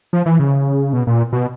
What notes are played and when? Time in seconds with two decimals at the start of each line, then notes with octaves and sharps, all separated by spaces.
0.13 F3
0.26 E3
0.39 C#3
0.93 B2
1.07 A#2
1.33 B2